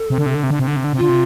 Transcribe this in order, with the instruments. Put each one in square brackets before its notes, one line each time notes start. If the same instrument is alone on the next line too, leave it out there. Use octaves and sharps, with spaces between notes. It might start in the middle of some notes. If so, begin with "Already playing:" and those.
Already playing: [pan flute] A4
[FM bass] C3
D3
C3
D3
C3
D3
C3
D3
C3
D3
C3
[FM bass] D3 [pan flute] F4
[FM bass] C3